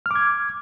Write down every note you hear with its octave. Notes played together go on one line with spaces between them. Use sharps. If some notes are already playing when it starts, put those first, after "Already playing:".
D6 F6 G#6